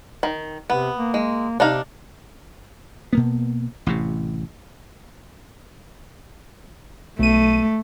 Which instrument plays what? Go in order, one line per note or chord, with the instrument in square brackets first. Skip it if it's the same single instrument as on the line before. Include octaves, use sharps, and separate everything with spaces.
[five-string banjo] D#3
[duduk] C3 [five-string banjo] B3
[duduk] A#3
[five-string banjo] G#3
[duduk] C3 [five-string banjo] D4 D#4 F5
[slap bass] B2 A#3 B3
A1 A2 C3
[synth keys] B1 D#7 [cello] A3